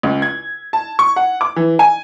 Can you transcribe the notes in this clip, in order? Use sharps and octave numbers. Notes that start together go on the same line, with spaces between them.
C#2
G#6
A5
C#6
F#5
D6
E3
G#5